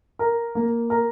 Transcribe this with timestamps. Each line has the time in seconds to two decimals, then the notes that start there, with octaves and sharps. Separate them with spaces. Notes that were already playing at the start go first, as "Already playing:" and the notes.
0.19 A#4
0.55 A#3
0.90 A#4